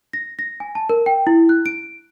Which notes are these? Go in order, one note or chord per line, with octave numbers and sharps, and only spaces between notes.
A#6
A#6
G#5
A5
A#4
G5
E4
F#6
D7